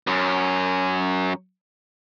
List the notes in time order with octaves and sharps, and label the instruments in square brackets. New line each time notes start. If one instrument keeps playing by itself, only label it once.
[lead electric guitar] F#2 C#4